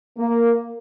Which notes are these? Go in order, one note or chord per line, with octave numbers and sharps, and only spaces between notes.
A#3